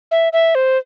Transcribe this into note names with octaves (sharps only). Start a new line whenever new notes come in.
E5
E5
C5